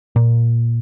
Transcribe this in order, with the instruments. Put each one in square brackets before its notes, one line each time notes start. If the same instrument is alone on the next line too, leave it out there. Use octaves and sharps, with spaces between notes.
[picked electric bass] A#2